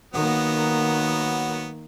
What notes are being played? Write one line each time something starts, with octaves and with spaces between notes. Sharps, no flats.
D#3 F#3 A#3 B3